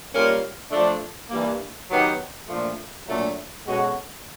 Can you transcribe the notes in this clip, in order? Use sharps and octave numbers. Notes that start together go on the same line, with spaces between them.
G3 A#3 C#4 F4 A#4
F3 A3 D4
G2 E3 G3 A#3
D#3 F#3 B3 D#4 G4
A#2 F3 A3 D4 F4
A#2 F#3 A3 D4
B2 G#3 C#4 F#4 A4